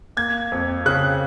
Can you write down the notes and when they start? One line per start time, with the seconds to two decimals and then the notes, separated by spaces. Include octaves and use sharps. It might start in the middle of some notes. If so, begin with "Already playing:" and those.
0.17 A#3 G#6
0.52 F2
0.86 C#3 F#6